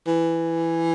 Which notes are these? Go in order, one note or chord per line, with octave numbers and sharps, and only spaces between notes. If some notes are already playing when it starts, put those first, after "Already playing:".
E3